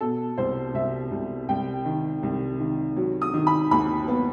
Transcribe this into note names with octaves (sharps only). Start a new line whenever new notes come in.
B2 A4
C2 C5
C2 E5
C2
C2 G5
D#3
C2
D#3
F#3
D#6
D#3
B5
D#2 B5
B3